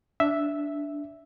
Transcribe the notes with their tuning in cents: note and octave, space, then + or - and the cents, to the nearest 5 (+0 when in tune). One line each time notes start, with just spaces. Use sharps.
D4 -10 E5 +0